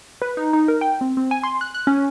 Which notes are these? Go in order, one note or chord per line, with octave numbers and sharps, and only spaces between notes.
B4
D#4
D#4
A#4
G5
C4
C4
G#5
C6
F#6
F#6
C#4